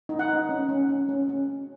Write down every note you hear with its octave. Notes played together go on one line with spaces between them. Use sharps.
D#4
F#5
D#4
C#4
C#4
C#4
C#4
C#4